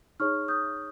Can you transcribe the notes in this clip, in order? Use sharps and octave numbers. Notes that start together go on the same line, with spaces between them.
D#4 G#4 C#5 C#6 F6
D#6 G6